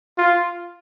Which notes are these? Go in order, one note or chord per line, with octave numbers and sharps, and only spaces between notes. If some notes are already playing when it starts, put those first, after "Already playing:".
F4